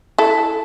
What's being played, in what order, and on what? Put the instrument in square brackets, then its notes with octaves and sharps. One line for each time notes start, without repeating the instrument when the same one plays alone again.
[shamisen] E4 A4